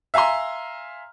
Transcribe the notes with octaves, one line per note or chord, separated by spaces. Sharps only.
E5 F5 G#5 A#5 C6